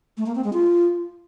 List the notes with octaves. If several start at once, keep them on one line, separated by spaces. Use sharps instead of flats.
A3
A#3
C4
G#3
F4